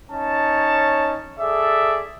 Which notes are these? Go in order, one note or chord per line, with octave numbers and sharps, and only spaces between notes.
C#4 D#4 C#5 A5
G#4 A4 D5 E5